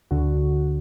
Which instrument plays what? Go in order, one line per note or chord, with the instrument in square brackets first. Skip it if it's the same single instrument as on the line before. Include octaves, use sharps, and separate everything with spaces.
[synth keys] D2 D3 F#4